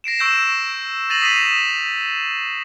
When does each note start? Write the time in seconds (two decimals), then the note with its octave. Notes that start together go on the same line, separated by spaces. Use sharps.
0.04 A#6 C7 D7 E7
0.19 C#6 E6 G6 D7 E7
1.10 A6 A#6 C7 D#7 F7 F#7
1.22 D#6 B6 C7 D#7 E7